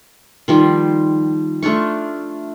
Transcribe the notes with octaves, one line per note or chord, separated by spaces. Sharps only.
D#3 F3 G3
A3 D4 F4 C#6